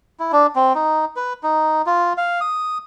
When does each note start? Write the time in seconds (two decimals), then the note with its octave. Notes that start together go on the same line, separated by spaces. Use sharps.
0.19 E4
0.32 D4
0.56 C4
0.75 D#4
1.16 B4
1.43 D#4
1.86 F4
2.17 F5
2.41 D#6